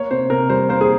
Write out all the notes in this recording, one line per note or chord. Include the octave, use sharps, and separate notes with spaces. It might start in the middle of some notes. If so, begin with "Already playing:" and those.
Already playing: A#3 C#5
C3 C5
C3 A#4
G3 C5
A#3 C5
G#4